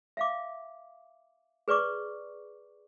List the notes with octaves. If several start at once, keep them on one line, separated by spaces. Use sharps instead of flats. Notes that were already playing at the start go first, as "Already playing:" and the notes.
E5 F5 D6
G#4 B4 D5 C#6 D6